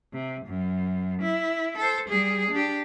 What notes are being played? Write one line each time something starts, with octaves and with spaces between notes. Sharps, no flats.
C3
F#2
E4
A4 C5
G3 G#4
D4 G4